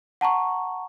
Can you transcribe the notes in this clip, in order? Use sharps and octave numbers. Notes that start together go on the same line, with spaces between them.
F#5 A5 A#5 C#6